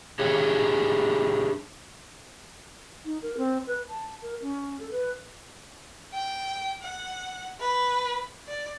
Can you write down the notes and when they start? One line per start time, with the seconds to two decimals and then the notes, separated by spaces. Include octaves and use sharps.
0.19 D4 G4 G#4 C#5
3.05 D#4
3.22 A#4
3.38 C4
3.67 B4
3.88 A5
4.22 A#4
4.42 C#4
4.80 A4
4.91 B4
6.13 G5
6.82 F#5
7.60 B4
8.47 D5